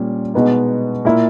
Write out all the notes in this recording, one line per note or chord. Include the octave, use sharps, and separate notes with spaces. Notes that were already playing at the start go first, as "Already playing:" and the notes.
Already playing: A#2 G3 C#4
B2 G#3 B3 D#4
A#2 A#3 E4